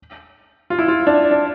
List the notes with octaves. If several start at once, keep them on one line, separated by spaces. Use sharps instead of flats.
F4
E4
F4
D4
D4